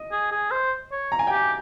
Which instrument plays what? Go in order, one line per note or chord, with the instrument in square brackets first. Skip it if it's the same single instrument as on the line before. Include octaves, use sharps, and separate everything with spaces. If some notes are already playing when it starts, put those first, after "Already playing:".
Already playing: [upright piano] D#5
[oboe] G#4
G#4
C5
C#5
[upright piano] A#5
G#5
G5
[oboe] G4 [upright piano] G#5